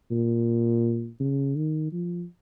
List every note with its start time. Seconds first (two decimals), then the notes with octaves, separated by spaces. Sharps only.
0.11 A#2
1.20 C#3
1.56 D#3
1.92 F3